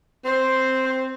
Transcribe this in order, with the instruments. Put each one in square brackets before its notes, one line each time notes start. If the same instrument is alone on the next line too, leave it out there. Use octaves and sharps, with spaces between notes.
[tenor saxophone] C4 [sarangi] C5